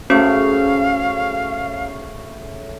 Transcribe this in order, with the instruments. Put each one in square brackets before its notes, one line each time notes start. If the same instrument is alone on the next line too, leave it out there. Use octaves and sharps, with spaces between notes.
[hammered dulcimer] C#3 A3 [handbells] C#4 F#4 C5 [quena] F5